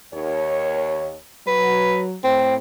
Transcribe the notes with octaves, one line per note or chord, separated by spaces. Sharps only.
D#2 C#5
F#3 B4
A2 C4